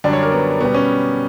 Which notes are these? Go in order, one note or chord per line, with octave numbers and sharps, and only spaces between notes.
F#2 D3 G3 D4
C#5
A#4
B3
B2 G3 B3
C#4